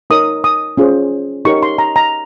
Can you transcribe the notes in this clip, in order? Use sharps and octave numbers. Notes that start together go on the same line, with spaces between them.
D#4 A#4 C#5 D#6
D#6
C#4 F4 G#4 C5
D#4 G4 A#4 C#5 C#6
C6
A#5
A#5